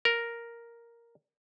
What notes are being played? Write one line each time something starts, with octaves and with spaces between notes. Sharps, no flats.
A#4